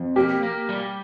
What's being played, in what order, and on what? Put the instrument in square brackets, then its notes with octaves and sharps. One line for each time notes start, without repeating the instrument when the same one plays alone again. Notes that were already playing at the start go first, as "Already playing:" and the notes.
Already playing: [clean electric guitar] F2
[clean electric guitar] A#3 [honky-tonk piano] G4
[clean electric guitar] A#3
G3